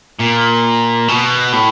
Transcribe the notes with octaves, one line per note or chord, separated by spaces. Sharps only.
A#2
B2
A2